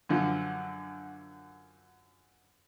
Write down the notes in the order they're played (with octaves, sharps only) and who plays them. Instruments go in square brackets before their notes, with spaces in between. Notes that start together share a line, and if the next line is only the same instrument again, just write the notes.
[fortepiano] F#2 D3 F3